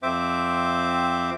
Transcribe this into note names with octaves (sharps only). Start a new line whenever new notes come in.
F2 C4 C5 E5 D6